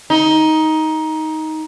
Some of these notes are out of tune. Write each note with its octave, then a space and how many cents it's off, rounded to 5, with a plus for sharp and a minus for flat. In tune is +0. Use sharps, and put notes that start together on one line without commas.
D#4 +15